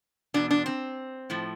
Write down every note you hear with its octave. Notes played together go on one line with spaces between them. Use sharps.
E2 B2 D4
D4
C4
A2 F3